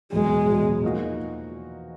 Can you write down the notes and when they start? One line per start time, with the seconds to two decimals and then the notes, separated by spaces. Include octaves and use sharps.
0.12 E2 B2 F#3 G#3
0.48 E2 B2 F#3
0.83 F3 A#3 D#4 F#4